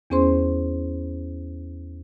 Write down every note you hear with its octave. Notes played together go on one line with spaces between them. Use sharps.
E2 B3 C#4 G#4 C5 C6